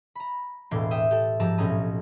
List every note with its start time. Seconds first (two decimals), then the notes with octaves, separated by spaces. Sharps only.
0.15 A#5 B5
0.71 E1 A2 C6 D6
0.91 E5 G5 D#6
1.11 G4 A4
1.40 G#2 F3 G4 A5 A#5 E6
1.58 B1 A2 C4 C#4 A#5 D#6